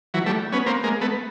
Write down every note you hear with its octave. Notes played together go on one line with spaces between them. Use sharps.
E3 F#3
G3 A3
B3 C#4
A#3 C4
G#3 A#3
A3 B3